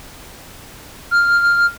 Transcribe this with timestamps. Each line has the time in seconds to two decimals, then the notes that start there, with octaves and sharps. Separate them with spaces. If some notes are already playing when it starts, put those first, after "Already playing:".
1.11 F6